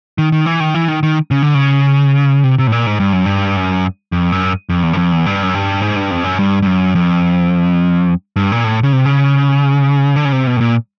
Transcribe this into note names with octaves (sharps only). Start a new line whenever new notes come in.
D#3
D#3
E3
D#3
E3
D#3
D#3
C#3
D3
C#3
C3
C3
A2
A#2
G#2
G2
F#2
G2
F#2
F2
F#2
F2
E2
F#2
F2
E2
G2
F#2
G2
G#2
G2
F2
F#2
G2
G2
F#2
F2
G2
A#2
A2
C#3
C3
C#3
D3
C#3
C3
B2
A2
A#2